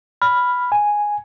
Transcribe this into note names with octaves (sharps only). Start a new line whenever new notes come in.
B5 F6
G#5